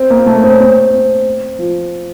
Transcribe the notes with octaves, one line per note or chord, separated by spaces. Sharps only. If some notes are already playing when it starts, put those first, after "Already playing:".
Already playing: C4
A#3
A3
A#3
C4
C#4
C4
C4
F3